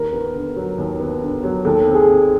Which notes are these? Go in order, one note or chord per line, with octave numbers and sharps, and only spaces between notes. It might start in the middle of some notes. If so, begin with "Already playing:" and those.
Already playing: D#2 A#4
B3
D3
F#3
D#2
B3
D3
F#3
D#2 A4
C4
G#4
D#3